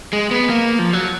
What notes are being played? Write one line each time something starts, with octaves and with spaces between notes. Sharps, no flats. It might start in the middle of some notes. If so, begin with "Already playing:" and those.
G#3
B3
A#3
F3
F#3